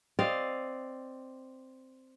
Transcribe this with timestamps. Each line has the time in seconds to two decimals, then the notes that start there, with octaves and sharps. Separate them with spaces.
0.19 C4 D5 D#5 F5